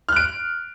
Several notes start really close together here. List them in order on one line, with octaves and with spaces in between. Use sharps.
F6 F#6 D7